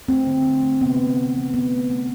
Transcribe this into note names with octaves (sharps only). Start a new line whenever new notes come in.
A3 C4
D3
A3
A3
C3 B3
A3
A3
E3
A3 B3
A3
A3